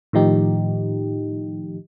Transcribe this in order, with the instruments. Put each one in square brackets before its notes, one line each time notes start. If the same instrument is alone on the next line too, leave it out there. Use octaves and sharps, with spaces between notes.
[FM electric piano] A2 D#3 F3 D#4 G4